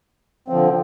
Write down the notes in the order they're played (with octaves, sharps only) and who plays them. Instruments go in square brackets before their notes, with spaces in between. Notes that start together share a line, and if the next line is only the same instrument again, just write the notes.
[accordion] D3 F3 C4